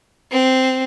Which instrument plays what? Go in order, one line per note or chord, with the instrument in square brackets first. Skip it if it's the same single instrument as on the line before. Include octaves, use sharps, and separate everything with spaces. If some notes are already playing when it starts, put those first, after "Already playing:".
[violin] C4